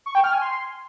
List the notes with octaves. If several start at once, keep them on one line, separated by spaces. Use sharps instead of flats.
C#6
G5
F6
G#5
C6